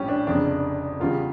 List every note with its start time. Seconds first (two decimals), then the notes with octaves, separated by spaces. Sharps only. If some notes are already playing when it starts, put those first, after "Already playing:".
Already playing: A#1 A2 G3 C#4 G4
0.08 D4
0.27 F1 F2 C#3 D4
1.00 E2 C#3 G3 F4